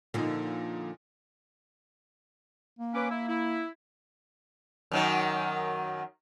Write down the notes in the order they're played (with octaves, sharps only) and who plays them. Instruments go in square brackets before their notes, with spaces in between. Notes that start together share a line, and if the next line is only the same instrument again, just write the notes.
[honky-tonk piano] A#2 D#4 [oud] D3 F3 A#3
[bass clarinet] A#3
[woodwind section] C#4 B4 D6
E4
E4
[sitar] F#2 D#3 F#3